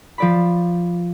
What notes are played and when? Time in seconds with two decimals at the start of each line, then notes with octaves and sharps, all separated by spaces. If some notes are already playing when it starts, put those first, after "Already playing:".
0.18 F3 D5 B5